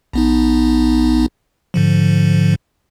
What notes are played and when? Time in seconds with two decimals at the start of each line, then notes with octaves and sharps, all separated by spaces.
0.13 A#1 B3 D#4
1.74 G#2 D3 F3